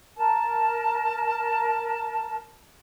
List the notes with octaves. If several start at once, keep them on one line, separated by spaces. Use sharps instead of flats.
A#4 A5